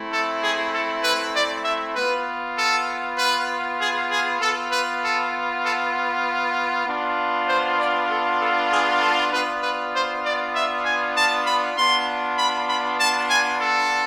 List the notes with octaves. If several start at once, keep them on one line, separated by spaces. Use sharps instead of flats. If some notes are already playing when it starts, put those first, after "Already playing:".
Already playing: A3 C4 E4
A4
G#4
A4
B4
D5
E5
B3 F4 B4
A4
B4
G#4
G#4
B3 F4 A4
B4
A4
A4
B3 D4 F4
C5
D5
A4
A4
G#4
A4
B3 D4 F4 B4
B4
C5
D5
E5
G#5
A5
B5
B3 D4 F4 C6
B5
B5
A5
G#5
A4